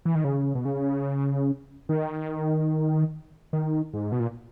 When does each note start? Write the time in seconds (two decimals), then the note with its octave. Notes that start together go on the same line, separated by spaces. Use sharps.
0.05 E3
0.15 D#3
0.24 C#3
0.55 B2
0.65 C#3
1.89 D#3
3.53 D#3
3.94 G#2
4.12 B2
4.20 A#2